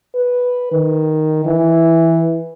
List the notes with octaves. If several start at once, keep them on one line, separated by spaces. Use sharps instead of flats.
B4
D#3
E3